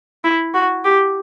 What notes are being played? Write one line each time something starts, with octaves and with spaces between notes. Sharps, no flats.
E4
F#4
G4